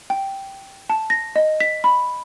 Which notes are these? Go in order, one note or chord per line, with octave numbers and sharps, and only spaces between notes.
G5
A5
A#6
D#5
B6
B5